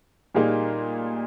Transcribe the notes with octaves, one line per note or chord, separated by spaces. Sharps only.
A#2 G3 A#3 D#4 G#4